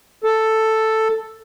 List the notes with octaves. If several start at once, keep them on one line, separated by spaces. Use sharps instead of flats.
A4